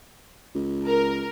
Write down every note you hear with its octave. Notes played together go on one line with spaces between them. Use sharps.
C#2
A#4